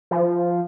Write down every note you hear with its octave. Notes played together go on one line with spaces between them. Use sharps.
F3